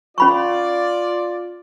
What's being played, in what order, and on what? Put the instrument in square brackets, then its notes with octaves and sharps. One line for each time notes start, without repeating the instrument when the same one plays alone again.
[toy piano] C#4 B5 C#6 [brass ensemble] F4 D5